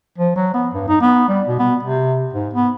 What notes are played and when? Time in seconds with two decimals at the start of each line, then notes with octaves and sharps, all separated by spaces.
0.18 F3
0.36 F#3
0.54 B3
0.74 G2
0.88 D#4
1.01 B3
1.28 G3
1.48 B2
1.59 B3
1.83 C3
2.34 G#2
2.54 B3